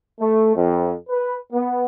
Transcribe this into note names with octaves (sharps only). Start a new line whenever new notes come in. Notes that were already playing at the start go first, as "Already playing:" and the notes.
A3
F2
B4
B3